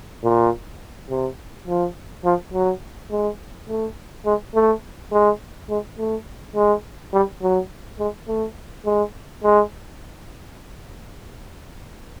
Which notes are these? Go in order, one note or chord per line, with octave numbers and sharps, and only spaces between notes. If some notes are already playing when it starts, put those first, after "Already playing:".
A#2
C3
F3
F3
F#3
G#3
A3
G#3
A3
G#3
G#3
A3
G#3
G3
F#3
G#3
A3
G#3
G#3